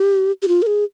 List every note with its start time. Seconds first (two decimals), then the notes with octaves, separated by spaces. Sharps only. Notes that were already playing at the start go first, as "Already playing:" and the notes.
Already playing: G4
0.42 G4
0.48 F4
0.62 A#4
0.67 G#4